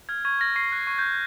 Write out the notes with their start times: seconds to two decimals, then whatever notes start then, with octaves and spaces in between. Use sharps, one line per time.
0.09 F6 G#6
0.25 C#6 G#6
0.40 F6 A#6
0.56 C#6 C7
0.72 F#6
0.87 C#6
0.98 G6
1.02 F#6